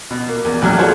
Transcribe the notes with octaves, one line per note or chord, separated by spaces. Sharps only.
B2
A#3
E2
A1 D#2 F#3 G3 F6
F#4 G#4 A4 C5 C#5 F5